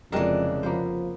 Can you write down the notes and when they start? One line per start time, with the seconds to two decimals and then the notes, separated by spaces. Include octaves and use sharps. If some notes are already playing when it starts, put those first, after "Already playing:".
0.12 F1 F2 C#3 E3 G#3 C4 D4 A#4
0.63 F3 A#3 B3 C5